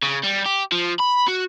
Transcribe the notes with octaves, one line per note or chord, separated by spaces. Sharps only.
C#3
G3
G4
F3
B5
F#4